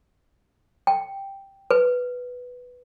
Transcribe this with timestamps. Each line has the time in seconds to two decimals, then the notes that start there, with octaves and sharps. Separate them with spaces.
0.87 G5
1.71 B4